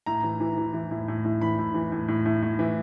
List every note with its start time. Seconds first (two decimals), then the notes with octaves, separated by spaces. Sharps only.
0.06 A2 A#5
0.23 E3
0.40 E3
0.57 E3
0.73 E3
0.91 A2
1.08 A2
1.24 A2
1.41 E3 B5
1.59 A2
1.74 E3
1.92 A2
2.08 A2
2.26 A2
2.42 A2
2.59 E3